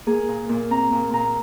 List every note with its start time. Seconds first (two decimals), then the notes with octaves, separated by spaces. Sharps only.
0.07 A#3 G#4
0.28 A#2
0.49 A#2
0.70 C4 A#5
0.92 A#2
1.13 A#2 A#5